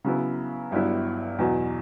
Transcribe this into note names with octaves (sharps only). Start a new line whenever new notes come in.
C#3 F#3 B3 E4
G1 G2 F#3 B3 E4
E2 B2 F#3